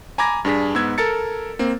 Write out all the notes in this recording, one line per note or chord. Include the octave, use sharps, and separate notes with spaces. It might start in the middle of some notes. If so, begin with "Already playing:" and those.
G#5 A#5 B5 D6 G#6 A#6
G2 D4 G#4 B6
G#2 B3 E6 G#6
A4 A#4 A6 C#7
A#3 C4